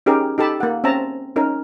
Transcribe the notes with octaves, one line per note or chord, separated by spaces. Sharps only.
C#4 D#4 G4 G#4 A#4
D#4 G4 A4 A5 B5
A#3 F#5
C4 C#4 E5 A5 A#5
C#4 D#4 A#4